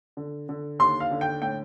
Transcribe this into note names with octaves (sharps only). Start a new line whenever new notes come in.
D3
D3
D#2 C6
F5
D3
G5
A2 G5